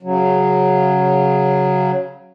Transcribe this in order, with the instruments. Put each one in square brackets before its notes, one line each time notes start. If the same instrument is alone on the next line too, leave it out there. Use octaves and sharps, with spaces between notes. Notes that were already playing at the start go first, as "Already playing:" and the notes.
[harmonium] C#3 F#3